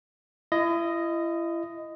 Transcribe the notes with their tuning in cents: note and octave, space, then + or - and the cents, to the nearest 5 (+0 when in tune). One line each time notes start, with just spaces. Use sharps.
E4 +35 D#5 +0